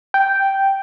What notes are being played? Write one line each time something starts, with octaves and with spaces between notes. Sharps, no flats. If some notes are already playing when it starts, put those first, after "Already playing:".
G5